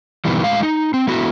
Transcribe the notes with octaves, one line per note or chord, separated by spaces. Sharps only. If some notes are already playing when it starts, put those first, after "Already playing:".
B2 D#3 E3 G3
A2 G#3 F5
D#4
C4
A3 B3 E4 F#4